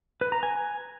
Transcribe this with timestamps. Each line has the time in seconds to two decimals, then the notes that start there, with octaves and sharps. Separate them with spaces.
0.21 B4
0.32 A#5
0.43 G#5